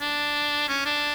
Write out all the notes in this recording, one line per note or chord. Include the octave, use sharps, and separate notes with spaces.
D4
C#4
D4